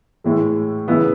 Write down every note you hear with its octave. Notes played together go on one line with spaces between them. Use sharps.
A2 E3 G#3
C#3 E3 B3 E4